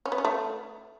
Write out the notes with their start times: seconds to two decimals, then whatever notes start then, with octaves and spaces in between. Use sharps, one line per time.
0.06 C#4
0.12 B3
0.18 C#4
0.25 A3